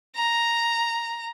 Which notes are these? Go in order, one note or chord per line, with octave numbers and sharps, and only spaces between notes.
A#5